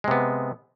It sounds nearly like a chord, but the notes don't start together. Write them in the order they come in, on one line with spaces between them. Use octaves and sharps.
G#3 C3 B3